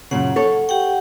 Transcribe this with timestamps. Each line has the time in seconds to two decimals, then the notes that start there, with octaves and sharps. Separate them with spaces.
0.11 F#2 A#2 C#3 F#5
0.36 A4 C#5
0.69 G4 F#5 G5